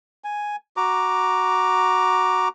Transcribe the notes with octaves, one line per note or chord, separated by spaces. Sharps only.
G#5
F#4 A#5 D6